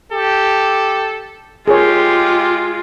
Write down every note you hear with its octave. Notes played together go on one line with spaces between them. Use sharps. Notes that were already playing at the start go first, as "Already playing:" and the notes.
G4 A4
G#3 F4 G4 G#4 A#4 C#5